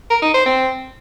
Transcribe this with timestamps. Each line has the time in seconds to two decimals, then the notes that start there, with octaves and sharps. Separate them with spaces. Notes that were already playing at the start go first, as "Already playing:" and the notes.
0.10 A#4
0.22 D#4
0.34 C5
0.46 C4